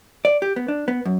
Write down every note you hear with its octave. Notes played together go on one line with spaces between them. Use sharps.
D5
G4
B3
D4
B3
F#2